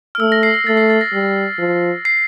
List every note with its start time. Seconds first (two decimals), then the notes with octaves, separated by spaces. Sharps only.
0.15 F6
0.19 A3 E6
0.32 A#6
0.43 C7
0.54 C7
0.66 A3 A6
0.77 C7
0.90 A6
1.01 A#6
1.13 G3
1.59 F3
2.05 C7